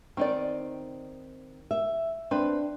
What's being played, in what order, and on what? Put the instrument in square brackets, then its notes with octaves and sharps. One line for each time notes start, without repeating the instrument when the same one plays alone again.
[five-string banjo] D#3 D#4 D5 [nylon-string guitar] C4
[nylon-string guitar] E5
[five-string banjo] C4 B4 [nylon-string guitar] D4